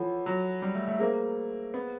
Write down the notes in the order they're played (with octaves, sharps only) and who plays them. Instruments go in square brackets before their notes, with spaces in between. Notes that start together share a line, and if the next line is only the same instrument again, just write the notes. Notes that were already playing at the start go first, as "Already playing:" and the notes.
Already playing: [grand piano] E3 F3 [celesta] A4 C#5 F#5 B5
[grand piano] F#3
G3
A3
A3
[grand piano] A#3 [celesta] G#4 C5 F5
[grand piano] B3